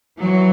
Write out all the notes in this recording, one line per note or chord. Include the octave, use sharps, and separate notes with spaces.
E3 F#3